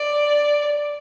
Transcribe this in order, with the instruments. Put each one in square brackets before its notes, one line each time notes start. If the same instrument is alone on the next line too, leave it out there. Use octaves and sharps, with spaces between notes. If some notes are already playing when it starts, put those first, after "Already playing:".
Already playing: [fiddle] D5